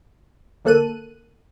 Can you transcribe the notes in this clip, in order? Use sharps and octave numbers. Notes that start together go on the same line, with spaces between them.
D2 A#3 A4 F#6 D#7